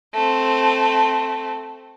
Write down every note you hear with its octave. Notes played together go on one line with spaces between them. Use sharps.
A3 C4